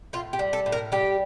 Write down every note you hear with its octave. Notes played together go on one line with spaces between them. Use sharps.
A2 F4
G4
G3
A4
A2
A#4
G3 G4